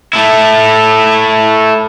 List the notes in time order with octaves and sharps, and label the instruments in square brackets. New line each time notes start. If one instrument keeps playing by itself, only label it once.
[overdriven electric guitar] A3 E4